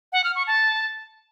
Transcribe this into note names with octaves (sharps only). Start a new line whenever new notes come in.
F#5
F6
C#6
A5